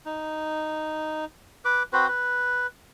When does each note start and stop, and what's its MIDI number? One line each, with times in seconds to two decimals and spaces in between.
0.05 1.25 63
1.65 1.83 71
1.65 1.83 86
1.93 2.07 60
1.93 2.07 66
1.93 2.07 71
1.93 2.07 72
2.08 2.67 71